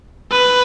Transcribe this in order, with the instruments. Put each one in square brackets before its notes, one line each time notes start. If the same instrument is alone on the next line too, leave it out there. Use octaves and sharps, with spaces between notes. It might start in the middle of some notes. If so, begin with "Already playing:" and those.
[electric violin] B4